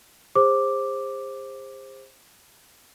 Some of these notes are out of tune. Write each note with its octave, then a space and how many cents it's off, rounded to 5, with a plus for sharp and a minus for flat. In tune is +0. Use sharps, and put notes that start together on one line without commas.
G#4 -45 C5 +15 D6 +0